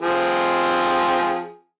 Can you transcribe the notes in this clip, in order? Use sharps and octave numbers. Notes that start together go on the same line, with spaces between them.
F3 C4 G#4